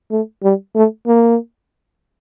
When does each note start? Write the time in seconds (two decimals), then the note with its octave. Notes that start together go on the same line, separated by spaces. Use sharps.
0.11 A3
0.43 G3
0.75 A3
1.07 A#3